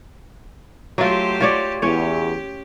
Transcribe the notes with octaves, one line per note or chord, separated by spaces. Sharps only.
F#3 A3 F4 G4 C5
F4 C#5 D5
E2 C#4 G4 C#5